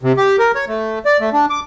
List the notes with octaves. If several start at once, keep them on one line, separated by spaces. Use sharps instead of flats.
C3
G4
A#4
C#5
A3
D5
A3
D4
D6